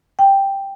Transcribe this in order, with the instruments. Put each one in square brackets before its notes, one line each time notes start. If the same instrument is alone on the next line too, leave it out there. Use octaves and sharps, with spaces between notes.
[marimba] G5